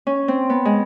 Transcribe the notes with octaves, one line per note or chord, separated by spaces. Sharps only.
C#4
C4
B3
G#3